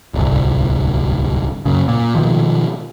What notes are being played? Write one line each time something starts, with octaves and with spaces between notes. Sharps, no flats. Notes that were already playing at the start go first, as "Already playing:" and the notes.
D1 G1 C2
F#2 C#3
A#2
B2 D#3 F3